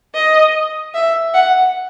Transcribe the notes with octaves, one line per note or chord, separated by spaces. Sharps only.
D#5
E5
F#5